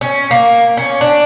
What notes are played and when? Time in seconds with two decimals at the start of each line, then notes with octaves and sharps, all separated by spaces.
0.01 C#4
0.31 A#3
0.77 C#4
1.01 D4